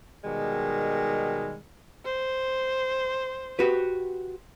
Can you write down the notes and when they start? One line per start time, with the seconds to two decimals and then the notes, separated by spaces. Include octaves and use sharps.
0.24 B2 D#3 G3 G#3
2.05 C5
3.59 F#4 G4 B4